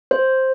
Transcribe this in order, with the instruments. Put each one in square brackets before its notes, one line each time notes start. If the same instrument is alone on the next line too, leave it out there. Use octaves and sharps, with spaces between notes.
[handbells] C5